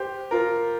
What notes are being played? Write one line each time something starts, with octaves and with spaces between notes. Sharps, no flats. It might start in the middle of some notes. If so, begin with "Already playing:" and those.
Already playing: G4 C5
F4 A#4